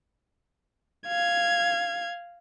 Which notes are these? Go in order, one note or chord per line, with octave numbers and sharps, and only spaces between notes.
F5 G#6